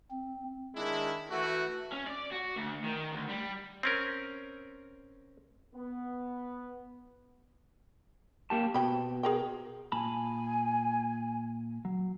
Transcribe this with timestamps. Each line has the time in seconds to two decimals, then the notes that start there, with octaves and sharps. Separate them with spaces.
0.11 C4
0.76 D#3 G#3 D4 E4
1.29 E3 A3 F#4
1.92 C#4
2.07 D5
2.31 F#4
2.56 D2
2.84 D#3
3.12 D2
3.29 G3
3.83 C4 C#4 A#4
5.75 B3
8.50 A#3 G4 A5
8.74 B2 C4 G5 B5
9.23 G#4 A#4 G5
9.92 A#2 G#5 A5 B5
11.85 F#3